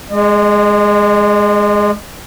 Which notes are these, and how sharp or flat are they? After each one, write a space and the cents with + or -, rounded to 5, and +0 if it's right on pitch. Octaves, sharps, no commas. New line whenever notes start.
G#3 +0 D#5 -40